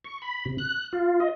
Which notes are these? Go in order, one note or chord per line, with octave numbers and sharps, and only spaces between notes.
C#6
B5
C3
F#6
F4
D#5